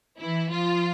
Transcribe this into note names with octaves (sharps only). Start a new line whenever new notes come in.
E3 E4
F3 F4